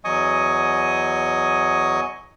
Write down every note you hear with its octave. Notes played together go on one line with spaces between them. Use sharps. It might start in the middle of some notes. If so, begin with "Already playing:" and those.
E2 F#3 D#5 G#5 C#6 D#6